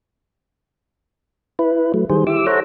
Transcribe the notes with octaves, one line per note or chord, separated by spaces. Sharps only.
E4 B4
F#3 A3
D#3 G3 G#4 C5
E4 G4 D6 E6
A4 C5 C#5 E5 F#5 A#5